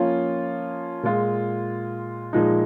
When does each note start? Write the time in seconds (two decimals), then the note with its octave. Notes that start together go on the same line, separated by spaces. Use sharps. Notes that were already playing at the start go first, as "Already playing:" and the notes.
Already playing: F3 A#3 C#4 F4
1.03 A#2 G#3 F4
2.33 A#2 F3 G#3 D#4